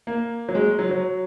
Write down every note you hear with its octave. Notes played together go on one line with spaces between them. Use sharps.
A#3
F#3
G#3
F#3
F#3